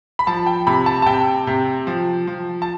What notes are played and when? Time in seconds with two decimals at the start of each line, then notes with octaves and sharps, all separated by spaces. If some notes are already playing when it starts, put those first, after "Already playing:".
0.19 B5
0.27 F3 A5
0.46 G5
0.67 C3 B5
0.86 A5
1.02 A5
1.06 C3 G5
1.47 C3
1.87 F3
2.27 F3
2.62 A5